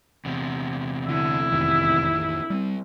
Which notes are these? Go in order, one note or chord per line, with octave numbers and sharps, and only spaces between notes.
E2 C3
D3 E4
A1 F2 D#3
G3 A#3 C4